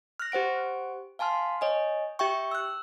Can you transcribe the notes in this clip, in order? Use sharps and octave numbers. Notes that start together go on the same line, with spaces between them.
F6 F#6 A#6
G4 C5 F#5 D7
F5 G#5 A5 C6 F6
C#5 D#5 G#5
G4 E5 G5 C#6
E6 F#6